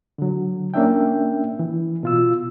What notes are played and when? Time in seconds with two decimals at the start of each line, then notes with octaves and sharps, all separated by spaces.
0.18 D3 F#3
0.74 A#3 C#4 D4 E5 G5
1.59 E3
2.03 B2 F4 E6